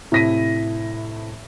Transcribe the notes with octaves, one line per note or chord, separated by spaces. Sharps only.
A2 C3 E4 A#6 B6 D#7